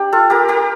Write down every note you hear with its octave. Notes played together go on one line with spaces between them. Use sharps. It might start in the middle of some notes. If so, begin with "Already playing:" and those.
Already playing: D4 G4
F4 A4
G4 A#4
G4 A#4